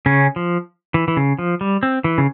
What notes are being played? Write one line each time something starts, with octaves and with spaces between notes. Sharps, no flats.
C#3 C#4
F3
E3
E3
C#3
F3
G3
C4
E3
C#3